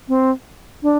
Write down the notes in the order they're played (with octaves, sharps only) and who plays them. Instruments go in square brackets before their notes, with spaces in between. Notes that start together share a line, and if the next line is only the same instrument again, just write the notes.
[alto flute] C4
D4